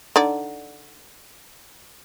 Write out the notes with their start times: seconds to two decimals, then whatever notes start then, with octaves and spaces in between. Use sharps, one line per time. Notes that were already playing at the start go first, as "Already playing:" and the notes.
0.16 D3 D#4 D5